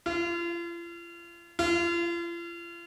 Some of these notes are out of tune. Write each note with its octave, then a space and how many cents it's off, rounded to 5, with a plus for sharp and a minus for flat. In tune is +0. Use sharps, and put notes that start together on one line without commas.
F4 -40
F4 -40